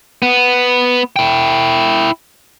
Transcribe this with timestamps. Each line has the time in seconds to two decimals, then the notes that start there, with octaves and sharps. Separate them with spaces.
0.22 B3
1.16 E4 G5